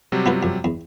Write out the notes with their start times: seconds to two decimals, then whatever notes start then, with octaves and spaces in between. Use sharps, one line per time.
0.12 C3 F#3 G3
0.26 B3 F4 B4
0.43 F2
0.64 E2